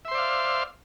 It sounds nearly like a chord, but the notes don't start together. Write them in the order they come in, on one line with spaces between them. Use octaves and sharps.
E5 C6 C5 D5 F5